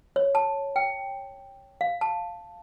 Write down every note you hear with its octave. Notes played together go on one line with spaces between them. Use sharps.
C#5
A5
G5
F5
A5